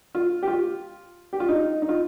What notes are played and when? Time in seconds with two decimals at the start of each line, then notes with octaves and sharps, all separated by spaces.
0.15 F4
0.43 G4
0.47 F4
1.33 G4
1.40 F4
1.49 D#4
1.82 D#4
1.89 F4